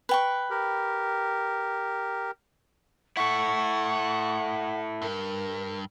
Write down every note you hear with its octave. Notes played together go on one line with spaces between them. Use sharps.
B4 G5 C#6
G4 A#4
E4 A4 F#5 C#6
G2 A#4